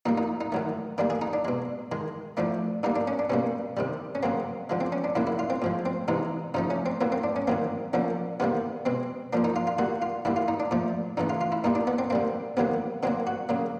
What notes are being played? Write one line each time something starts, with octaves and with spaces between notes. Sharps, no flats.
A#2 G3 A#3 D#4
D#4
D#4
D#3 F#3 A3
D#3 G3 A#3 D4
G#4
D#4
D4
B2 G#3
D#3 G#3
A2 F3 A3 D4
D3 G3 A#3 D#4
D4
C#4
D4
B2 G3 A#3 C#4
C3 D#3 G3
C#4
C#3 F#3 A#3 C4
D3 F3 G#3
C4
C#4
D4
C#3 F#3 A#3 E4
E4
F4
C4
A2 F3 G#3
C4
C3 E3 G#3 D#4
C#3 F3 A3 D#4
C#4
C4
A2 F#3 A#3 B3
C4
D4
C#4
D#3 F#3 A#3 C4
D3 F3 A#3 C#4
C3 D#3 G3 A#3 B3
B2 G#3 C4
A#2 F3 A#3 D4
D#4
F4
F4
D3 G3 A#3 F#4
F4
D3 G3 A#3 E4
F4
D#4
D4
A#2 F3 A3
C#3 E3 A3 D#4
F4
F4
E4
A#2 G3 A#3 D#4
D4
B3
C4
D3 G3 A#3 C4
C3 D#3 F#3 A#3 B3
D3 F#3 A#3 C4
F#4
C#3 F#3 A#3